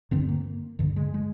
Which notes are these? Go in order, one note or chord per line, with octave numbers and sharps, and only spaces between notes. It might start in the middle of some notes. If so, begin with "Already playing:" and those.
G2 D3 C4
A#3
G2 D3
G#3
G#3